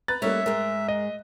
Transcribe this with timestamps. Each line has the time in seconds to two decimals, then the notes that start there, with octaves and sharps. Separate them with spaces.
0.08 B4 A#5 F#6 A6
0.22 G3 A3 A#3 C#4 C#5 D#5 E5
0.46 G#2 G#3 A#4
0.88 D#5